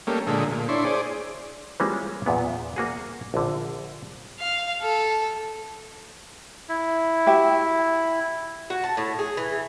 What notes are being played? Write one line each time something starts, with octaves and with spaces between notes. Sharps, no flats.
G3 A3 A#3 C#4
A#2 D3 G#3 A3
A#2
D4 E4 C#5 C6
G#4 C5 D5
E3 G3 G#3 A#3 C#4 F4
E2 A#2 B3
A#3 F#4 G#4
A#1 D3
F5
A4
E4
F#4 G4 E5
F#4
A5
A2
G#4
E3